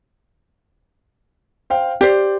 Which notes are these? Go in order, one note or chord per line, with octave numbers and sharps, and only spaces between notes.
C5 F5 G5
G4 C5 D5